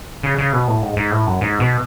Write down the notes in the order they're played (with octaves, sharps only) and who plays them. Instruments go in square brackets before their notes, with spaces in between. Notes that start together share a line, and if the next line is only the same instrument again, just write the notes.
[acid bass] C#3
C#3
B2
A2
G#2
G#2
A2
F#2
G#2
B2